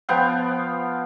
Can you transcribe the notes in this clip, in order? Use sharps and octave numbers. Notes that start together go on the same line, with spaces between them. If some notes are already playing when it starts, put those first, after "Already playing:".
F3 B3 F5 G5